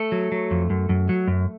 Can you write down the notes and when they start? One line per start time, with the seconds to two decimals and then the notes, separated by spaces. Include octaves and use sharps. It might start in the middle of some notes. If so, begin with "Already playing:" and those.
Already playing: A3 A4
0.12 F#3
0.32 F#3
0.51 F2
0.70 F#2
0.89 F#2
1.09 F#3
1.28 F#2